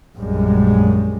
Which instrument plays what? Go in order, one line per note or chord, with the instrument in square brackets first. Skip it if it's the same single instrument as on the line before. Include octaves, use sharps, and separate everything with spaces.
[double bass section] A#1 F#2 G3 G#3